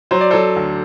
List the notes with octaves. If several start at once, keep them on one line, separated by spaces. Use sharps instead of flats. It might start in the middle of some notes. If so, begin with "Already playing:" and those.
F#3 C5
D5
F#3 A4 C5
D2